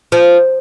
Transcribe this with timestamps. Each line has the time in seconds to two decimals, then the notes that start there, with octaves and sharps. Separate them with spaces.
0.12 F3